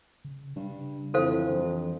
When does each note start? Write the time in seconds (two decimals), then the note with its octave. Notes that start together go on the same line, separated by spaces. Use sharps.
0.25 C#3
0.56 G2 C#3
1.14 F2 E3 A4 C5 F5
1.50 G2 E3